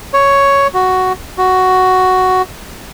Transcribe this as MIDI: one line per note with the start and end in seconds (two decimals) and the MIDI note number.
0.13 0.67 73
0.74 1.13 66
1.38 2.42 66